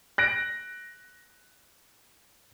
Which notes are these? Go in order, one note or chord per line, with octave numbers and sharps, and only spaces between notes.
F#6 A#6 D7